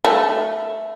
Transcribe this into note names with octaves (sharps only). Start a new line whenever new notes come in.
A3